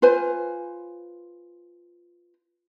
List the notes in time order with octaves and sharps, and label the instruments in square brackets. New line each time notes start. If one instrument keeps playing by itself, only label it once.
[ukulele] F4 B4 C5 G#5